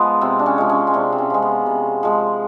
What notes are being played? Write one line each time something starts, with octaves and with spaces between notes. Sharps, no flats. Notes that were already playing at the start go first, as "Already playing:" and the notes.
Already playing: F3 G#3 B3
C3 C4
D4
C#4
F3 G#3
C#4
C#4
C3 D4
C4
C#4
F3 G#3
B3
C3
F3 G#3